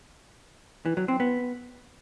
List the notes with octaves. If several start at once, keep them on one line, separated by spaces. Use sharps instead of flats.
E3
F#3
C4
B3